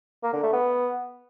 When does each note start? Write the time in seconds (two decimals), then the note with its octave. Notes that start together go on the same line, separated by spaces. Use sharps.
0.23 A#3
0.33 D3
0.43 A3
0.53 B3